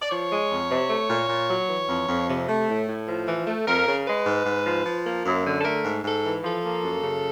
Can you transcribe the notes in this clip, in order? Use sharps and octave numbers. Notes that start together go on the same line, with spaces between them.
D5
F3 C#5
G#3
F2
C3
A3
A#2
A#2
F#3
E3
F2
F2
C3
A3
A2
A2
F3
E3
A3
F2 A#4
C#3
G#3 B4
G#2
G#2
F3
F3
A#3
F#2
D3
A4
A3 A#4
G#2
G#2 A4
E3
F3 A4
A#3
F#2
C#3